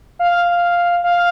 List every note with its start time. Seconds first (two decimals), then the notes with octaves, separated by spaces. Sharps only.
0.19 F5
1.04 F5